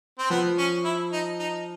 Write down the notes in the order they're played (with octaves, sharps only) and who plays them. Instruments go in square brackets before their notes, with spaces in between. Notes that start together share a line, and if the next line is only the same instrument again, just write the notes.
[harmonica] C4
[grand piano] F3 [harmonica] B3
[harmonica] C#4
E4
D#4
D#4